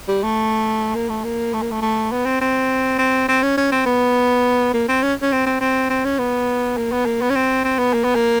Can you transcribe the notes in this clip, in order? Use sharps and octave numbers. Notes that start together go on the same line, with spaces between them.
G3
A3
A#3
A3
A#3
A3
A#3
A3
A3
B3
C4
C4
C4
C4
C#4
C#4
C4
B3
A#3
C4
C#4
C#4
C4
C4
C4
C4
C#4
B3
A#3
B3
A#3
B3
C#4
C4
C4
B3
A#3
B3
A#3